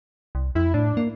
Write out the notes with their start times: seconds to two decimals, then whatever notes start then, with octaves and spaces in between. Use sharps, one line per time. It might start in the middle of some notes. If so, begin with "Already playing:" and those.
0.35 C2
0.55 F2 E4
0.74 A2 D4
0.97 A#3